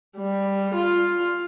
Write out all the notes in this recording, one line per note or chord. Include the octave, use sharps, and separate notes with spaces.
G3
F4